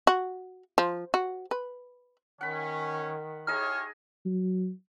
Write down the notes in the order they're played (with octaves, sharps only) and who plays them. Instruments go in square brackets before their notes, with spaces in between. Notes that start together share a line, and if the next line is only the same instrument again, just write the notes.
[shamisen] F#4
F3
F#4
B4
[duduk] D#3 [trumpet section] C#4 [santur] F#5 B5
[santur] D#4 G#4 D#5 [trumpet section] E4 G4 C#5 [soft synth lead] F6
[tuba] F#3